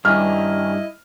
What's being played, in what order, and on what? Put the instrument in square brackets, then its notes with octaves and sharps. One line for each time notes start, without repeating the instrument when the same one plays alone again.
[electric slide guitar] G2 [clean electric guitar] D#3 C#4 [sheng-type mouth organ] E4 D#5 [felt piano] F6